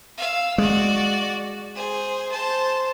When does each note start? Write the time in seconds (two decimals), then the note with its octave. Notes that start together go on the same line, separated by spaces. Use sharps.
0.18 F5 E6
0.58 G#3 F#4 D5
1.75 G#4 C5
2.31 C5 A5